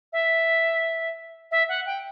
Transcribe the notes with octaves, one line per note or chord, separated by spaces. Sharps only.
E5
E5
F#5
G5